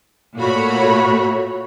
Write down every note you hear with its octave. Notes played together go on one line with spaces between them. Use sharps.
A#2 A3 F#4 C#5 B5